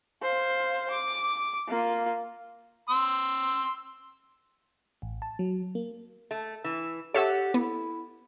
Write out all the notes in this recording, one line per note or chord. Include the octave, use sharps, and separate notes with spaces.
C5 F5
D6
A#3 F4
C6 E6
A1
A5
F#3
A#3
A3
E3 E6
G4 A4 C#5 E5 F#5 E6
B3 E4